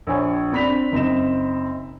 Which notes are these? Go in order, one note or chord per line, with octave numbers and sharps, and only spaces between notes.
A#1 C5 C#5 G#5
C4 D4 B5 B6 F7
F#1 C4 D#4 E7